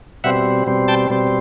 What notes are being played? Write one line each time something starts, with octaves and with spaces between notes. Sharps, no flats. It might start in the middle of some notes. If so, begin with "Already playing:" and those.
B2 G3 C4 E5 F#5
B2 G3 C4
G5 A5
B2 G3 C4